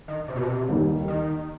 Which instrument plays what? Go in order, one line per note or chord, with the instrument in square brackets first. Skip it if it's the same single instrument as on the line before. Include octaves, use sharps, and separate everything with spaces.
[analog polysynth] D#3
C3
B2
C3
[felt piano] D#2 D#3 G3
[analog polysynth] D#3